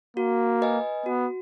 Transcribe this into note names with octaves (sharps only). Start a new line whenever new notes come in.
A#3 F#4
B4 D#5 G#5
B3 F#4